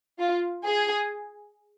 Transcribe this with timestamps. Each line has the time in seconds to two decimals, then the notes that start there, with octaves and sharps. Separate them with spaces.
0.19 F4
0.64 G#4